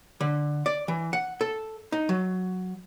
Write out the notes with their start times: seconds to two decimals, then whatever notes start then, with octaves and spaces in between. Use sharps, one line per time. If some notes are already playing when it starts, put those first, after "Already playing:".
0.21 D3
0.66 D5
0.88 E3
1.13 F#5
1.41 A4
1.92 D#4
2.09 F#3